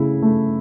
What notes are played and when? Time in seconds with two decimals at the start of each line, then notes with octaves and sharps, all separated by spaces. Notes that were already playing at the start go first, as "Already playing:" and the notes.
Already playing: C#3 A3 E4
0.22 A3